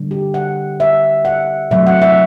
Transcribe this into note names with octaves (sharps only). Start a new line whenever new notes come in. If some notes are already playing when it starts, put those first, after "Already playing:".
Already playing: D3 G3
G4
F#5
E5
F#5
C3 F#3 A3 E5
F#5
E5